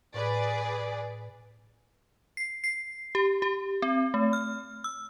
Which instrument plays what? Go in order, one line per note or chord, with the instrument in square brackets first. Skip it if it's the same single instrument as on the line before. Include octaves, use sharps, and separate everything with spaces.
[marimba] A2 [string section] G#4 B4 D5
[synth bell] C7
C7
G4
G4
C4
A3
F6
E6